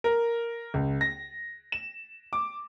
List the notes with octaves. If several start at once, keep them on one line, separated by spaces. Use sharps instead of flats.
A#4
C#2
A#6
E7
D6